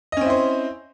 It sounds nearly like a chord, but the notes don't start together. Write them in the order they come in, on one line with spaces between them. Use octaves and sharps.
D#5 C#4 C4 E4 C5